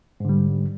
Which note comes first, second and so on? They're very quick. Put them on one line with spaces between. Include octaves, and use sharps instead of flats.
G#2 D3 G3